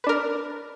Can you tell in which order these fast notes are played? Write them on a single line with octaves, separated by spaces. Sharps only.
B4 D4 A#4